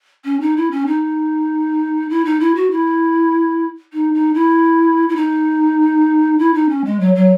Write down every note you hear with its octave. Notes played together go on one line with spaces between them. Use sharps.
C#4
D#4
E4
C#4
D#4
E4
D#4
E4
F#4
E4
D#4
D#4
E4
E4
D#4
E4
D#4
C#4
G#3
F#3
F#3